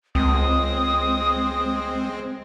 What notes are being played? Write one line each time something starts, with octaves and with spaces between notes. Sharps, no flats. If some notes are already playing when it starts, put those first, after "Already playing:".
C#2 G#3 C4 D#6